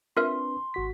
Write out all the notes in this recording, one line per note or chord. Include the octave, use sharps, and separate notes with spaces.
C4 D4 F4 A#4 B4 E5 C6
G#1 F#4 B6